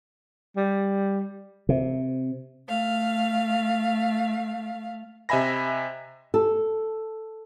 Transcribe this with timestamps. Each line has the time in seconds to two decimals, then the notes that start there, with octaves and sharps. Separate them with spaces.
0.56 G3
1.69 C3
2.67 A3 F5
5.29 C3 D#5 E5 G#5 B5 A#6
6.34 A4